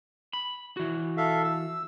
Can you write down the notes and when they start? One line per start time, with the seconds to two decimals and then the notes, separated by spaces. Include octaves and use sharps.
0.33 B5
0.77 E3 F#4
1.17 A4 E5 F5
1.44 E6